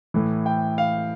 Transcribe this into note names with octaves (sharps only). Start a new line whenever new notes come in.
A2 E3
G5
F5